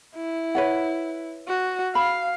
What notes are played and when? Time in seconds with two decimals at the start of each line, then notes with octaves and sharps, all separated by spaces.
0.15 E4
0.55 B4 C#5 F#5
1.48 F#4
1.95 F5 B5